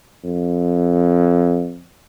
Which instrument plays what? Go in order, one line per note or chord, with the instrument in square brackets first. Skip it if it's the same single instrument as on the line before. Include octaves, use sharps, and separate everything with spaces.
[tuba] F2